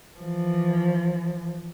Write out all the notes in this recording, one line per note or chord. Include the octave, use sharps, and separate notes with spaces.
E3 F3